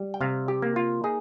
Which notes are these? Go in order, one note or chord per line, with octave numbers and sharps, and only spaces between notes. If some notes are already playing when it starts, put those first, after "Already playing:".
Already playing: G3
G5
C3 F5
G4
A#3
F4
D#4 G#4